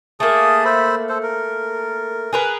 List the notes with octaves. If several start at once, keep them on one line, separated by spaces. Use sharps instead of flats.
A3 A#3 G#4 A5 D#6
C5 E5 B5
A4 C5
A#4
G#4 A#4 B4